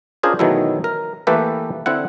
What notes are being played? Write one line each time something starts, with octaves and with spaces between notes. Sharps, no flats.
C#4 D4 F4 G#4 A#4 C5
B2 D#3 E3 F#3 A3 E4
A#4
E3 A3 A#3 G4 A4 B4
D3 C4 E4 F#5